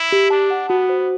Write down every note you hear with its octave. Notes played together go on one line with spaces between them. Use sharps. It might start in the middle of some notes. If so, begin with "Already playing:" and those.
Already playing: E4
G4
D4 A5
F#5
B3 F#4
C5